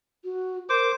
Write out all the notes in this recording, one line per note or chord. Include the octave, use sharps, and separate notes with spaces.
F#4
A#4 C5 D6